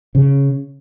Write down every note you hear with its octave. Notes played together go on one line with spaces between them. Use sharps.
C#3